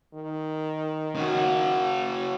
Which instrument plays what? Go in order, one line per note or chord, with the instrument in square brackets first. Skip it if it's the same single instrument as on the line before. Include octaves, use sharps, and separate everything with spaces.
[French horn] D#3
[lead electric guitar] C#3 F#4